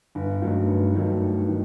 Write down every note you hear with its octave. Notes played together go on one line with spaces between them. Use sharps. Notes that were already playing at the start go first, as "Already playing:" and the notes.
G1
G2 D#3 F#3 A3
G1
G2 D#3 F#3 A3
G1
D#3